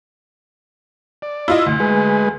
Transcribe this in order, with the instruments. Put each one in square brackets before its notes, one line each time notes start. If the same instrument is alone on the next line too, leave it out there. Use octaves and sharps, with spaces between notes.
[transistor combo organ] D5
[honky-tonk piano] E4 F4 D#5
D2
[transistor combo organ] G#3 G#4 B4